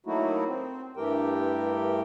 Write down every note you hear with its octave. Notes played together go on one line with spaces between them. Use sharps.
F#3 A3 A#3 D#4 E4 F#4
C4
G2 E3 A3 G4 A#4 G5